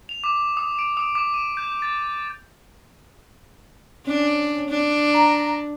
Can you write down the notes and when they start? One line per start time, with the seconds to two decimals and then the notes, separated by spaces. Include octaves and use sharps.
0.09 F7
0.24 D6
0.57 D#6
0.79 D7
0.97 D#6
1.15 D6
1.34 D#7
1.57 G6
1.82 A6
4.07 C#4 D4
4.69 D4
5.14 A#5